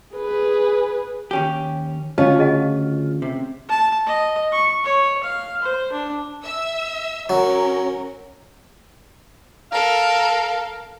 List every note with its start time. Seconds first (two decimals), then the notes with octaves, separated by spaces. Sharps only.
0.16 G#4 B4
1.31 D#2 C#4 G4
2.18 D2 C#3 C#4 F4 D#5 F5 A5
2.39 G#4 D#5 F#5
3.22 C3
3.69 A5
4.07 D#5
4.52 C#6
4.85 C#5
5.23 F5
5.62 C5
5.92 D4
6.44 E5 E6
7.29 F#3 C#4 A#4
9.72 A4 A#4 F5